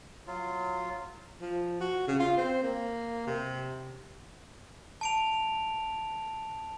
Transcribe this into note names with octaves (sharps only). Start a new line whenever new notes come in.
F#3 F4
F3
F#4
C#3
F4
C4
A#3
C3
A5 D7 F7